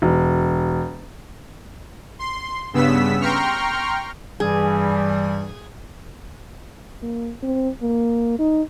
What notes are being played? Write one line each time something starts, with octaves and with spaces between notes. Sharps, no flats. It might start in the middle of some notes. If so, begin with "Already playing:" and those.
E1
C6
G2 C#3 B3 E6 B6
G5 A#5 C6 C#6 F6
G2 E3 G3 G#4
A#3
C4
A#3
D#4